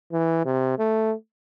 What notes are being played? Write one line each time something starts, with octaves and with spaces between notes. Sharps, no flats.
E3
C3
A3